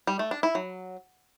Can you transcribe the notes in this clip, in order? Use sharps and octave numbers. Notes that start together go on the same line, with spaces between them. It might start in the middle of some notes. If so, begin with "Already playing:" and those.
G3
A3
D4
E4
F#3